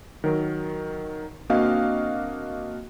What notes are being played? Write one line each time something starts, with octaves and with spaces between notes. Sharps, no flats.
D#3 F#3 A#4
A#3 C4 D4 F#4 D#5 F5